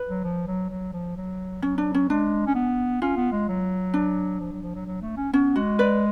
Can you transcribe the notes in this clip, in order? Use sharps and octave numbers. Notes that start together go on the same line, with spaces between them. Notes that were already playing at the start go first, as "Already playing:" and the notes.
Already playing: B4
F#3
F3
F#3
F#3
F3
F#3
F#3 C#4
D4
C#4
G#3 D4
C#4
B3
C#4 F4
B3
G#3
F#3
D4
F3
F#3
F3
F#3
F#3
A3
C#4
B3 C#4
G#3 F#4
B4 D5